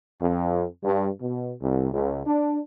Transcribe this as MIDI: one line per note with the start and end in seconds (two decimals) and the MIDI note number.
0.21 0.63 41
0.83 1.08 43
1.21 1.54 47
1.61 1.92 36
1.93 2.22 37
2.25 2.57 62